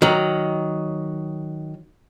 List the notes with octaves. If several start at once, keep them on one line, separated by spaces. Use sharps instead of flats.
D#3 F#3